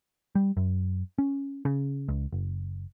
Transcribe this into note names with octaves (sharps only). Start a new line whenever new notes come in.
G3
F#2
C#4
C#3
C#2
F#1